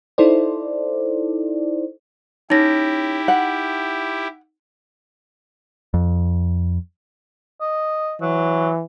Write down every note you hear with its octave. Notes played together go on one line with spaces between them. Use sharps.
D#4 E4 A4 C5 D5
C#4 D#4 E4 G4 A#6
F#5
F2
D#5
E3 F#3